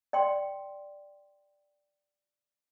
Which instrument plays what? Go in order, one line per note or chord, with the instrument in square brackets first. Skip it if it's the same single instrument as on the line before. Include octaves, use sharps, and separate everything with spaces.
[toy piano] D5 G5 C6